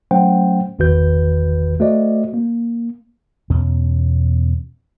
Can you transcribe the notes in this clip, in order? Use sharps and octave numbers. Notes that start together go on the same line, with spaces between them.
F#3 A3 C#4 C5 F#5 G5
G1 E2 D#3 F#4 B4 G6
A3 F#4 C5 D5 D#5
A#3
E2 B2 C#4